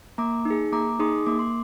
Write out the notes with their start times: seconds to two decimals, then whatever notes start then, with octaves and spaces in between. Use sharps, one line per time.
0.18 A#3 A#5 D6
0.45 D#4
0.50 G#4
0.72 A#3 A#5 D6
0.89 D6
1.00 D#4 G#4 C6 D#6
1.27 A#3 D6
1.39 C6